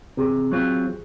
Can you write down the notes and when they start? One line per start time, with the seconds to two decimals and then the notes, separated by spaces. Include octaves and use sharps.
0.17 C3 G#4
0.52 F#3 C4 F4